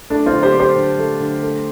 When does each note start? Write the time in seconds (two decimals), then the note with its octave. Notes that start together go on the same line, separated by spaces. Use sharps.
0.10 A3 D4
0.26 C4 F4
0.32 D3
0.43 G4 C5
0.54 C4
0.60 G4 C5
0.76 D3
0.99 A3
1.20 D3
1.43 A3